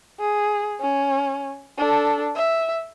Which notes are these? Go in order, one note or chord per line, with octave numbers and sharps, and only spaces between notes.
G#4
C#4
D4 A4
E5